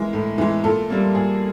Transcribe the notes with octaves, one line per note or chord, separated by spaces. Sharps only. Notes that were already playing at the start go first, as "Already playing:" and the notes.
Already playing: E3 G#3 A#4
A2
E3 G#3
A#2 A4
G3 A#3
A#2 G#4